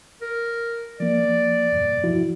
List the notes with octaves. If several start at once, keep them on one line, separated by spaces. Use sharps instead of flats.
A#4
F3 A#3 D5
E2 G2 B2
F3 E4 F#4